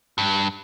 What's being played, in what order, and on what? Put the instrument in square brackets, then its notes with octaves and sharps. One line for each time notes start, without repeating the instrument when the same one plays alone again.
[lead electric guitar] G2